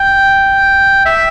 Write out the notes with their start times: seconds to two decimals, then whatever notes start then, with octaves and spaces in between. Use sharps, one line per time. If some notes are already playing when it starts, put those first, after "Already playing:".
Already playing: G5
1.05 E5